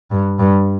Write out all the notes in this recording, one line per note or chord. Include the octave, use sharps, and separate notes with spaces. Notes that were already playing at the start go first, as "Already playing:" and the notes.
G2
G2